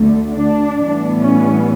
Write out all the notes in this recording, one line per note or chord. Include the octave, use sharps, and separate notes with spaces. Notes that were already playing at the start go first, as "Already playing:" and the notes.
Already playing: D2 D3 A3
D4
A2 E3 G3 B3
C#4